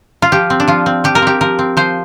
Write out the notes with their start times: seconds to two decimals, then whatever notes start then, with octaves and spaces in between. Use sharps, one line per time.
0.22 F4
0.32 F3 G4
0.50 C4
0.60 D4
0.68 F3 F4
0.86 C4
1.04 F3 G4
1.15 A#4
1.22 C4 G4
1.41 F3 A#4
1.59 C4
1.77 F3 C5